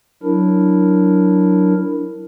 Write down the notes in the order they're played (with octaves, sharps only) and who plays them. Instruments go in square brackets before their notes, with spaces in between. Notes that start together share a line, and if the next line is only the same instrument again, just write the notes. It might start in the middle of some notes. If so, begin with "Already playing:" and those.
[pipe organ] F#3 D4 E4 A#4